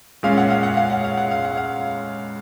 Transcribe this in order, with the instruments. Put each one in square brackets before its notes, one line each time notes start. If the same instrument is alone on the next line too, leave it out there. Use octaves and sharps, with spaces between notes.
[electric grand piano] A#2 G#3 C#4 [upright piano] F5
[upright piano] F#5
F5
F#5
F5
F#5
F5
F#5
F5
F#5
F5